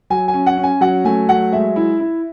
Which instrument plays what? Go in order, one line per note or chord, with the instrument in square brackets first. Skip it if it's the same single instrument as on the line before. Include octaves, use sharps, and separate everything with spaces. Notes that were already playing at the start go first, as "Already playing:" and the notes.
[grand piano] F#3 G#5
G#5
C#4
F#5
C#4
G#5
F#3 F#5
A3 G#5
F#3 F#5
G#3 E5
E4
E4